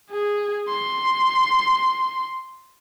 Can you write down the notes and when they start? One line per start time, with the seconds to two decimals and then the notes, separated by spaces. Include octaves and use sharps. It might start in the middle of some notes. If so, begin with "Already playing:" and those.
0.11 G#4
0.69 C6